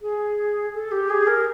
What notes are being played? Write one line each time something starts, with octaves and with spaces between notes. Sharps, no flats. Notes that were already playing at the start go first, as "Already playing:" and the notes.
G#4
A4
G4
G#4
A#4